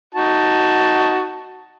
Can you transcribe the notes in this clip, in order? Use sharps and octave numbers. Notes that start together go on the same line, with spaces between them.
D#4 F#4 A5